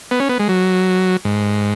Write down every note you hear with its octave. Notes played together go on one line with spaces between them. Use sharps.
B3
C#4
B3
G#3
F#3
G#2